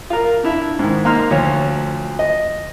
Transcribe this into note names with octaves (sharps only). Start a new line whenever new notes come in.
F4 A#4
D4 E4 E5
G#2 D#3
A#3 D#4 C6 F6
D2 F3 F4 C#5
D#5